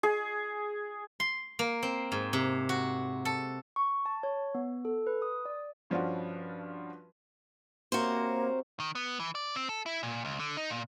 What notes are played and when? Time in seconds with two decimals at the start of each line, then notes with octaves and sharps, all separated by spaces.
0.03 G#4
1.20 C6
1.59 A#3
1.83 C4
2.12 G#2
2.33 C3
2.69 F#4
3.25 A4
3.76 C#6
4.06 A5
4.23 C#5
4.55 B3
4.85 A4
5.07 B4
5.22 D#6
5.45 D5
5.90 G2 F3 C#4 D4 F4 F#4
7.92 C3 A#3 C4 F#4 A#4 C5 C#5
8.80 D#3
8.95 B3
9.20 E3
9.35 D5
9.56 C4
9.69 A4
9.86 E4
10.03 A#2
10.25 C#2
10.39 D3
10.57 D#4
10.70 A#2